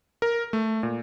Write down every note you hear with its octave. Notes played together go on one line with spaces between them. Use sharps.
A#4
A3
A#2